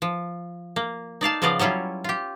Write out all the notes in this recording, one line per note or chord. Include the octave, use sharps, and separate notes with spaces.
F3
A#3
D#4 D5 F5 A5
C#3 F3 B3 D5 D#5 F5
F#3 G3 C#4 E4 F4
F4 G4